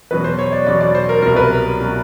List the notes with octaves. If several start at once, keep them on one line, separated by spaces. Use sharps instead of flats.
E2 B2 F#3 B4
C5
C#5
D5
E2 B2 F#3 D5
D5
C5
A#4
C2 B2 F#3 A#4
B4
A#4
B2 F#3